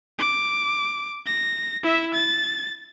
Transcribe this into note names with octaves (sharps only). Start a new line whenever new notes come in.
D6
A#6
E4 E5
A6